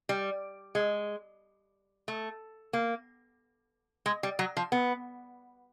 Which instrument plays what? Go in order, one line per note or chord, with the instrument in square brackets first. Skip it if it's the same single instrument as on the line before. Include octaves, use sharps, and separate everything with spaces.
[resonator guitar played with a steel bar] G3
G#3
A3
A#3
G#3
G3
F#3
F3
B3